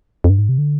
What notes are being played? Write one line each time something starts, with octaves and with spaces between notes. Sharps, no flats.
F2
G2
G#2
C3
D3